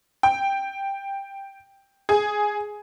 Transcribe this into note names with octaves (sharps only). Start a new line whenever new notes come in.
G5
G#4